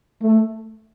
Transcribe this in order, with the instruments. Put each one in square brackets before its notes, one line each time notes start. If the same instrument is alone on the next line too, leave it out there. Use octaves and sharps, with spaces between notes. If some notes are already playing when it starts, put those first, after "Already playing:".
[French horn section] A3